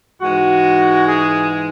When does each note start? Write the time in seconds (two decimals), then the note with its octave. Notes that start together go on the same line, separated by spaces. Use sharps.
0.20 G#2 E3 G#3 F#4
1.05 G#4